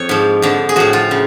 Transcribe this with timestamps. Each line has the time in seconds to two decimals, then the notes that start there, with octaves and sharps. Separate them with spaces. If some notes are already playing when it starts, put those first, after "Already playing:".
Already playing: F2 C#5
0.09 G#2 F3
0.42 F2 D3 F3
0.69 G#4
0.76 A2 F3 F#4
0.93 F4
1.11 C#3